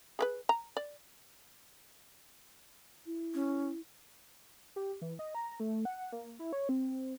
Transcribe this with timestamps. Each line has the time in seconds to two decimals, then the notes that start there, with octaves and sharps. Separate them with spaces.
0.19 G#4 A#4 B4
0.49 A#5
0.77 D5
3.06 E4
3.34 C#4
4.76 G4
5.02 E3
5.19 D#5
5.35 A#5
5.60 A3
5.85 F#5
6.12 A#3
6.39 E4
6.53 C#5
6.69 C4